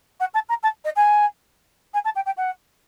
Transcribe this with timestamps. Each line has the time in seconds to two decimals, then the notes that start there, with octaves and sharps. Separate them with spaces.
0.20 F#5
0.34 A5
0.49 A#5
0.63 A5
0.85 D#5
0.96 G#5
1.94 G#5
2.05 A5
2.16 G5
2.26 G5
2.37 F#5